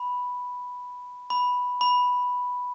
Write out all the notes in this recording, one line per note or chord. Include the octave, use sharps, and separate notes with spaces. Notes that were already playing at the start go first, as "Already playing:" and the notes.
Already playing: B5
B5
B5